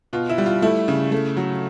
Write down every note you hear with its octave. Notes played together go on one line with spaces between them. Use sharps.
B2 F4
E4
G3
F4
A3 E4
C#3
A3
F#3